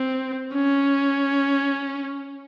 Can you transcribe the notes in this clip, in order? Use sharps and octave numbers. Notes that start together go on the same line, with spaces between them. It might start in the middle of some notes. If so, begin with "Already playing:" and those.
Already playing: C4
C#4